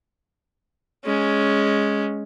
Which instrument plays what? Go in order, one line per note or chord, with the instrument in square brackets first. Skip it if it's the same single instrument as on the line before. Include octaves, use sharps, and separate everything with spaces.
[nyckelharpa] G#3 C#4